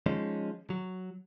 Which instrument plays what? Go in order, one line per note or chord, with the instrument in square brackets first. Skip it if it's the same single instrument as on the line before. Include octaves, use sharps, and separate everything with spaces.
[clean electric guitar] F3 G#3 C#4 D#4
F#3